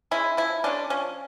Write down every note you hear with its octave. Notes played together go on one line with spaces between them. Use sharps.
G#3 C#4 E4
F3 E4
G#3 C#4 D4
F3 C#4